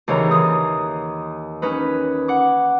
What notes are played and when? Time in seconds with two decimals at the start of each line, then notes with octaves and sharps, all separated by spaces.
0.08 D#2 C#3 E3 C#5 A#5
0.31 D#2 D#6
1.62 C#4 D#4 B4
2.28 F#5 D6